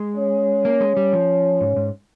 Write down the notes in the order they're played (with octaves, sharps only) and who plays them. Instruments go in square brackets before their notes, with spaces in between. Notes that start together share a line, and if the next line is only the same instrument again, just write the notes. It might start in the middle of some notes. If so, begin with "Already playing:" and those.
Already playing: [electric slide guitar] G#3
[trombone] C#4
[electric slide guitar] A#3
G#3
G3
F3
G#2
G#2